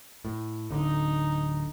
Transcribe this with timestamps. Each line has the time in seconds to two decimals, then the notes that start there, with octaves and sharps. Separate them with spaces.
0.25 A2
0.70 D1 D3 D#4